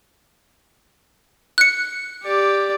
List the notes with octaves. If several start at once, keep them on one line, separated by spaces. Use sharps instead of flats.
F#6 C#7
G4 D5